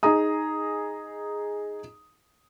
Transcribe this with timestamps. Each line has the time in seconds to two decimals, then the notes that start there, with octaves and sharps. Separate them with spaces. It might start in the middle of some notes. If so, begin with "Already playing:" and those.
0.03 D#4 G#4 D#5 A#5 D#6